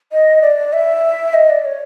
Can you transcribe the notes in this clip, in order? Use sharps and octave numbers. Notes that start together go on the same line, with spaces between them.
D#5
D5
E5
D#5
D5
C#5